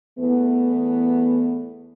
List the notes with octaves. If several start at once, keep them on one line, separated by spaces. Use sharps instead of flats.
E2 E3 A3 B3